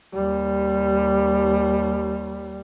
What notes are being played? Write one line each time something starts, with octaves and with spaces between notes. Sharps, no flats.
D#2 G3